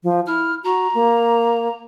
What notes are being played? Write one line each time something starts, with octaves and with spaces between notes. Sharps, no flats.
F3
E4 F6
F#4 A#5
A#3